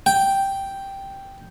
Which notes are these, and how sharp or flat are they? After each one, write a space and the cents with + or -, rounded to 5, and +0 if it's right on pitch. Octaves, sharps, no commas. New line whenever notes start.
G5 +0